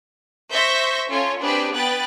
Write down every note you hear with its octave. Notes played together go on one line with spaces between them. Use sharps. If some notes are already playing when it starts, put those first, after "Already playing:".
C5 E5 C#6 G6 A#6 B6
C#4 F4 A4 C#5
C4 D4 G4 G#4 B4 B5
B3 B4 G5 F#6 A6